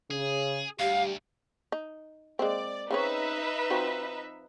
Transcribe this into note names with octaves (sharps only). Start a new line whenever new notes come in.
C#3 G#4
D2 G3 G4 F5
D#4
G#3 A#3 C4 D5
C#3 C4 D#4 B4 C#5 E5
F3 C4 F#4